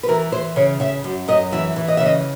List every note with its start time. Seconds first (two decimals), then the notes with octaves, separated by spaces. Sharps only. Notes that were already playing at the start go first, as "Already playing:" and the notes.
0.03 B4
0.08 E3 A#4
0.32 E3 C5
0.56 C#3 C#5
0.80 C#3 E5
1.04 F#2
1.28 F#2 D#5
1.52 E3 E5
1.76 E3
1.88 D#5
1.97 E5
2.00 C#3
2.06 D#5